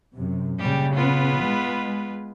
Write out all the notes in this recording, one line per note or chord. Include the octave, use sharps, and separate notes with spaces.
F#2 C3
A#2 C#3 G3 G4
B3 F4 B4
G#3